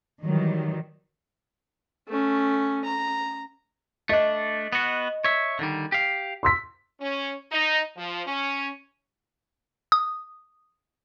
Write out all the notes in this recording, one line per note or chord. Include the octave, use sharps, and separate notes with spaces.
D#3 E3 F#3 G3
A3 C#4
A#5
A3 D4 D#5
B3 F#4
C#5 E5
D3 D#3 G3
G4 F5
C6 E6 B6
C#4
D#4
F3
C#4
D#6